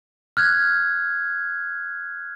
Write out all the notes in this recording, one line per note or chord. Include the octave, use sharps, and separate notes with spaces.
F6 F#6 G#6